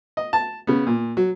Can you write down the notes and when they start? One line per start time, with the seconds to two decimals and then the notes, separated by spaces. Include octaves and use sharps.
0.17 D#5
0.33 A5
0.67 C#3 B3
0.87 A#2
1.17 F#3